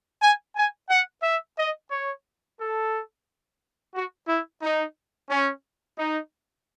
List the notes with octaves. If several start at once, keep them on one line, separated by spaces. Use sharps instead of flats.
G#5
G#5
F#5
E5
D#5
C#5
A4
F#4
E4
D#4
C#4
D#4